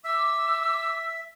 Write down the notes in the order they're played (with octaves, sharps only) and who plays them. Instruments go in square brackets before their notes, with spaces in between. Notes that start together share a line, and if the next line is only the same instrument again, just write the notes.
[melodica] E5 [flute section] D6 [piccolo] E6